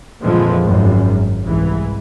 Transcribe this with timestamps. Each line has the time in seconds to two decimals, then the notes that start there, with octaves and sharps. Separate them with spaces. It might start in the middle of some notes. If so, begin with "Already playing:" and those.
0.21 F2 A#2 D3 E3 F3 G#3
0.63 G#1 F#2
1.42 C2 G#2 E3